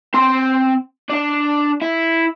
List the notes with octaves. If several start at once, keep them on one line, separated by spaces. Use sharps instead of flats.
C4 C6
D4 D5
E4